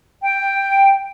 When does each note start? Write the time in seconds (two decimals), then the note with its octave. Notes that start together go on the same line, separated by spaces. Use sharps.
0.22 G5